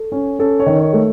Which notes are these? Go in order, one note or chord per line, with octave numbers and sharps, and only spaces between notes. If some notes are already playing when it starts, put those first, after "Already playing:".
Already playing: A4
C#4
C#4 A4
C#5
D#3
C#5
A3